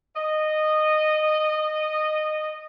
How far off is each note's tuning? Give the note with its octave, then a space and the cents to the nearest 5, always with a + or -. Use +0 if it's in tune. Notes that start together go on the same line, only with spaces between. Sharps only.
D#5 -15